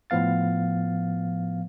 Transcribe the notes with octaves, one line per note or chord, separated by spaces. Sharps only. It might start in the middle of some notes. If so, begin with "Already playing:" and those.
A2 F3 B3 F5 A6